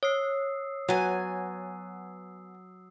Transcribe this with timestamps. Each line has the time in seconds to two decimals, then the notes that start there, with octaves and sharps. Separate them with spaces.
0.03 C#5 D#6 E6 C7
0.89 F#3 B3 G#5